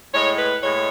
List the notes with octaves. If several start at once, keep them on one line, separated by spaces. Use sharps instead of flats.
A2 G#3 C#5
B4
A2 G#3 C#5